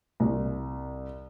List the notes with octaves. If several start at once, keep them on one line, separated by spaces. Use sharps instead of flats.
C2